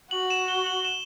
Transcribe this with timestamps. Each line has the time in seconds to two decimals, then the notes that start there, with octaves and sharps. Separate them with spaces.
0.11 F#4 F#7
0.30 E7
0.48 G7
0.66 F#7
0.85 E7